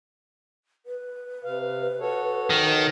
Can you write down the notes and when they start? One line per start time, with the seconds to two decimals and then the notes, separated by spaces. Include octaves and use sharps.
0.86 B4
1.44 C3 F5
2.00 F#4 A4 C#5
2.50 D#3